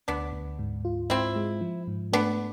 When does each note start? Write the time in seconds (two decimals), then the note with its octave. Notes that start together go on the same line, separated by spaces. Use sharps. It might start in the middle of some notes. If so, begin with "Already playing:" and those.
0.08 D2 B3 D4
0.33 D2
0.59 G#2
0.85 F4
1.10 G#2 C4 E4
1.36 G#3
1.61 F3
1.87 G#2
2.12 A3 B3 D4